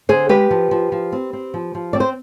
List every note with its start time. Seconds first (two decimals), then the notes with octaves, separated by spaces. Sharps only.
0.09 D3 G#4 C5
0.29 G#3 G4 B4
0.51 F3
0.71 F3
0.92 F3
1.12 C4
1.33 C4
1.54 F3
1.75 F3
1.93 C4 D5
2.00 C5